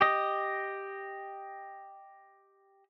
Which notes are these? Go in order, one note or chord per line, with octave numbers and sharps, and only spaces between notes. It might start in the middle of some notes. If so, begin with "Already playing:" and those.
G4 D#5